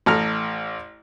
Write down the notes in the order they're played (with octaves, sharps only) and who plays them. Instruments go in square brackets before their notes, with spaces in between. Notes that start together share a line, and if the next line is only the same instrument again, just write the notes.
[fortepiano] A1 A4 A#5 F6